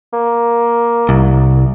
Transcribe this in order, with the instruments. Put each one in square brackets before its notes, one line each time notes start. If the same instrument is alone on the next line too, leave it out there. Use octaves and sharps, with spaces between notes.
[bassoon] A#3
[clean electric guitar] C2